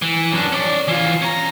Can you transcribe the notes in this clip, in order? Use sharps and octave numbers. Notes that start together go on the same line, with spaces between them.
E3
F#2 D4
C#4 D5
E3 F4
C#4 A#5